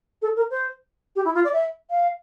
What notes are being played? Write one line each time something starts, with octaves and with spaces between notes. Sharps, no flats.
A4
A#4
C5
G4
E4
F4
D5
E5
F5